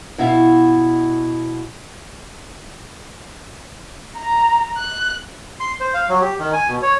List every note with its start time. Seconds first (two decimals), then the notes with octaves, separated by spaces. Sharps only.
0.18 B2 E4 E5 F5
4.16 A#5
4.77 F#6
5.60 C6
5.80 C5
5.94 F5
6.09 F#3
6.21 G4
6.39 D#3
6.53 G#5
6.68 B2
6.82 C#5